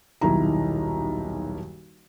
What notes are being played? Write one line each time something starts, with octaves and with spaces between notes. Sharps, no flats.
D#1 B1 D#3 E4 A#5